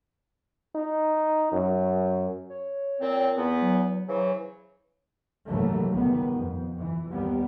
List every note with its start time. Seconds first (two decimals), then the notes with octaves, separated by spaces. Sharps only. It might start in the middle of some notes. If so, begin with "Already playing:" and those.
0.75 D#4
1.52 F#2
2.50 C#5
3.01 A#2 C4
3.36 E2 B3
3.62 F#3
4.08 C#3 E3 F#3 C5
5.48 F1 D#2 G#2 E3 F#3 A3
5.90 C#2 A#2 D#3 G3 B3
6.36 F2
6.78 E3
7.11 D#2 G3 B3